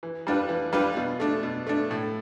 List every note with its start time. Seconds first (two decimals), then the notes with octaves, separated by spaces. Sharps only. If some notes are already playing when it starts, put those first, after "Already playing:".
0.03 E3
0.27 G3 D4 F4 B4
0.49 E3
0.73 G3 D4 F4 B4
0.97 B2
1.20 A3 D4
1.43 B2
1.67 A3 D4
1.91 A2